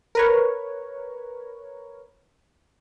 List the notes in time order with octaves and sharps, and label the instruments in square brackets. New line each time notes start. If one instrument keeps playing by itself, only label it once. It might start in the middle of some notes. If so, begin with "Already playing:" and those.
[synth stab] A#4 B4 C#5